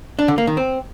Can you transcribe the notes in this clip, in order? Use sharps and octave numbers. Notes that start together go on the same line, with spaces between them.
D4
D3
A#3
D#3
C4